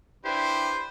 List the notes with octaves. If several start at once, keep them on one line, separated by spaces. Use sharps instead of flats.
D4 E4 G4 B4 C5